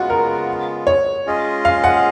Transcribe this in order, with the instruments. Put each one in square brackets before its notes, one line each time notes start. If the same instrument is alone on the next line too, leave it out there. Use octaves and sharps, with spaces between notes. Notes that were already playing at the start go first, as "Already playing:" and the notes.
Already playing: [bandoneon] C#3 G#3 B3 F4 [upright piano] F#4
[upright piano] A#4
C#5
[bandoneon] G#3 C#4 F4 G#4 D#5
[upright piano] F5
F#5